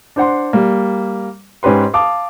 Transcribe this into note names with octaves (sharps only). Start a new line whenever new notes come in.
D4 C5 F#5 C6
G3 A#3
G#2 C#4 G4 B4 C6
F5 A5 D6 D#6